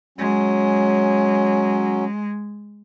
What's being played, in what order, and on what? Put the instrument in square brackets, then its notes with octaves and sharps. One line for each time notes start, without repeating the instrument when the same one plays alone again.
[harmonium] F#3 C#4 [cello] G#3